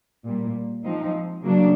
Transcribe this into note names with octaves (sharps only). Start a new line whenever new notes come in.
A#2 G3 A#3
F3 G#3 C4 D#4
C#3 F#3 A#3 D4